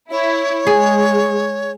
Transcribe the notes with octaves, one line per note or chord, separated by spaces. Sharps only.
E4 C#5
G#3 G#4